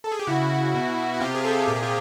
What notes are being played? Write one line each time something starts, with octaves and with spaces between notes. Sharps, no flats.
A4
G#4
G4
C#3 E4 F#4
C#3
B2
B2
F#4
C3 F4 G4
G#4
C3 G4 A4
A#2 G4
G#4
F4 G4